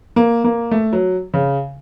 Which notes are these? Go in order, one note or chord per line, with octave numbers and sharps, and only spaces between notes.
A#3
A#3
A3
F#3
C#3